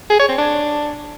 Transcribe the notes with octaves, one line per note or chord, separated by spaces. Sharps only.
G#4
C#5
C4
D4